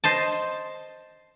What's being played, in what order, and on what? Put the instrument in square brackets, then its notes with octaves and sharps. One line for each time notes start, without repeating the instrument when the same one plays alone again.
[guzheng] C5 D#5 A5